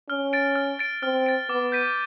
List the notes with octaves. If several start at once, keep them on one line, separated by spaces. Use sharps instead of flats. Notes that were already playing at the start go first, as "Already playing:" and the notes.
C#4 F6
A6 D7
F6
A6 D7
C4 F6
A6 D7
B3 D6
G6 B6 D#7